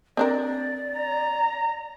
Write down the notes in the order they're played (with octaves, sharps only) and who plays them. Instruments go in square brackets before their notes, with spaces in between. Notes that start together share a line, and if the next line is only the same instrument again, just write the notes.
[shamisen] C4 D4 A#4 [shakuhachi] D5
[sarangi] A#5